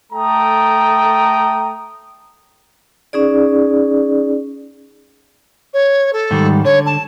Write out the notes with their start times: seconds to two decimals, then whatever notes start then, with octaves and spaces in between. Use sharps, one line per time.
0.12 A3 A4 G5 A#5 D#6
3.13 C#4 D#4 G#4 D5
5.73 C#5
6.13 A4
6.31 G#2 D#3 G3
6.65 D3 C#5
6.86 A5